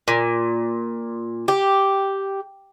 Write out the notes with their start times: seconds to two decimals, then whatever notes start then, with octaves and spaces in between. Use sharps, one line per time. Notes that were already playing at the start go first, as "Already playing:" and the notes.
0.08 A#2
1.48 G4